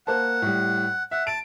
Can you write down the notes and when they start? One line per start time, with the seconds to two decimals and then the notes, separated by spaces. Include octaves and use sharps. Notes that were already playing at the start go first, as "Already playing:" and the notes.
0.07 A#3 C5 F#5 A5
0.42 A2 G3
1.11 E5 F#5
1.27 A5 D7